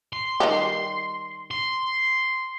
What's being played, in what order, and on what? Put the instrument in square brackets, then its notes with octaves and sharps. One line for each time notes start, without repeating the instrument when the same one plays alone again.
[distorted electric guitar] C6
[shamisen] D#3 G3 G4
[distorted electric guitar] C6